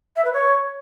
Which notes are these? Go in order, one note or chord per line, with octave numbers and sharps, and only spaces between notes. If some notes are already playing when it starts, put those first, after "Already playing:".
E5
B4
C#5